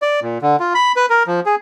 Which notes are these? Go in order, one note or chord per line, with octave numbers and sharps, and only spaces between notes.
D5
A#2
D3
F4
B5
B4
A#4
F3
G#4